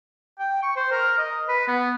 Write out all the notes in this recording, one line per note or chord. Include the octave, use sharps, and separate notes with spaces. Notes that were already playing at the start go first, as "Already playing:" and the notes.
G5
C#6
C5
A#4
D#5
B4
B3